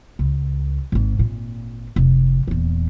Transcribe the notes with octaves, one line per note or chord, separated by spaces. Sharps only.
C#2
G#1 G#2
G#1 A#2
F1
D#1 E2